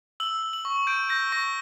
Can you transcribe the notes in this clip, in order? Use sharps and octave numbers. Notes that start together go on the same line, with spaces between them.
E6 F#7
E6
F#7
C#6
G6 D7
G6 A#6
C#6 A#6